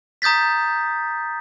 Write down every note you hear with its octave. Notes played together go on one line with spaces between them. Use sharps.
A#5 D#6 G6 A6 B6